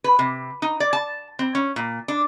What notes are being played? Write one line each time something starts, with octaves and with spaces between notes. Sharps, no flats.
B4
C3
D#4
D5
A5
C4
C#4
A#2
D4